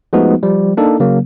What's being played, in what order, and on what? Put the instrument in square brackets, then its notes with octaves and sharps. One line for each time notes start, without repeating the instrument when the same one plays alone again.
[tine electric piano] F3 G#3 A3 B3 D#4 F#4
F3 G3
A#3 D4 D#4 A4
C#3 F#3 A#3